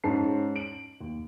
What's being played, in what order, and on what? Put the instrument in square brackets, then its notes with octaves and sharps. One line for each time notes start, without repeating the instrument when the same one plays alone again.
[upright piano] G#2 C#4 A5 C7
D7 F#7
D#2